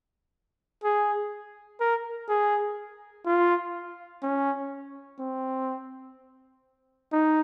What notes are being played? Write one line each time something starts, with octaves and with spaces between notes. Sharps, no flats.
G#4
A#4
G#4
F4
C#4
C4
D#4